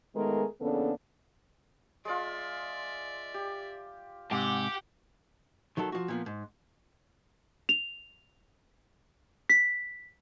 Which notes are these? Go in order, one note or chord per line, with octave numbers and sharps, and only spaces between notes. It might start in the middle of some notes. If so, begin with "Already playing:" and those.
D#3 G#3 A3 B3 G#4 A#4
E2 C#3 A#3 B3 D4 A4
G#3 F4 D5 E5
G4
G#2 C3 G4 F#5 G5
D#3 F#3 A3 A4
F3 F#4
A#2 F3 B3
G#2
F7
B6